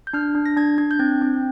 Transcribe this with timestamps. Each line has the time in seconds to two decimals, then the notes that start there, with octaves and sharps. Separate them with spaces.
0.07 G6
0.13 D4 F6
0.35 D4
0.46 A#6
0.56 D4 G#6
0.78 D4 G#6
0.91 G6
0.99 C4 G#6
1.22 C4